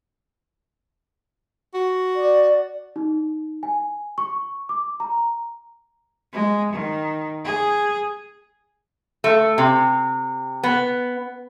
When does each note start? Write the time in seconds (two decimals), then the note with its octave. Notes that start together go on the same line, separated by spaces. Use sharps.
1.74 F#4
2.16 D5
2.96 D#4
3.63 G#5
4.18 C#6
4.69 D6
5.00 A#5
6.33 G#3
6.72 D#3
7.45 G#4
9.24 A3
9.58 C3
10.63 B3